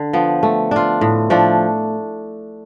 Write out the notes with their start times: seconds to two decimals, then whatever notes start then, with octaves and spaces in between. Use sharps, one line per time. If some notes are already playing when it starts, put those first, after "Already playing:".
Already playing: D3
0.13 F3 B3
0.43 A3
0.71 D4 F4
1.01 A2
1.30 F3 A3 D4